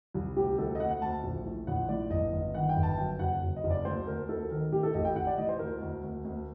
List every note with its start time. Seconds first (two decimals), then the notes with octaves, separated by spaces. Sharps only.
0.14 C2
0.36 D2 G4
0.58 D2 A4
0.75 D#5
0.80 D2 F#5
0.91 F#5
1.02 D2 A5
1.24 A#1
1.45 A2
1.67 A#1 F#5
1.89 A2 D5
2.11 G1 D#5
2.33 G1 D#5
2.54 D#3 F#5
2.69 G5
2.76 G1
2.83 A5
2.98 F#2 G5
3.19 F#1 F#5
3.41 F#1
3.56 D#5
3.64 F#1
3.70 D5
3.85 D2 C5
4.07 D2 A#4
4.29 D2 A4
4.50 D#3 A#4
4.72 A2 G4
4.83 A4
4.94 A1 D#5
5.05 G5
5.16 A1 F#5
5.27 D5
5.38 A2 D#5
5.49 C5
5.59 D2 A#4
5.82 D2
6.03 D2
6.25 D2